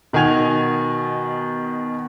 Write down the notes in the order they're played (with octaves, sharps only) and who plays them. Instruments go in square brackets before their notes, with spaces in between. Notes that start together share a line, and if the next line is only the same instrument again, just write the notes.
[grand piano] B2 D#3 F#4 G#5 G#6 F7